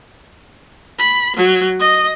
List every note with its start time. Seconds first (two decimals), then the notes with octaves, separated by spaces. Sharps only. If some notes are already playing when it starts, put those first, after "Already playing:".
0.99 B5
1.36 F#3
1.80 D#5